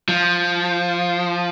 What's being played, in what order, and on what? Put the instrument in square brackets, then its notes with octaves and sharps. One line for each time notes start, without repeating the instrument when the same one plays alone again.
[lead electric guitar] F3